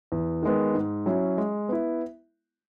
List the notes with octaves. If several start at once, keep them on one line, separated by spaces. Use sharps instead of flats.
E2
D#3 G#3 B3
G#2
F#3 C#4 E4
G#3
B3 E4